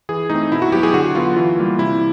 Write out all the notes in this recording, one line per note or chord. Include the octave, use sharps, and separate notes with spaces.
E3 G#4
A3 C4 D#4
B2 E4
F#4
F#3 B3 G4
G#4
D3 F#4
F#3 B3 F4
E3
G3 A#3
C3 E4